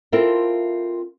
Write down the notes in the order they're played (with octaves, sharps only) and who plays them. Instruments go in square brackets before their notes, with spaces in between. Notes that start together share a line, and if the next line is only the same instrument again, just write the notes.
[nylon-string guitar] C4 E4 F4 A4 A#4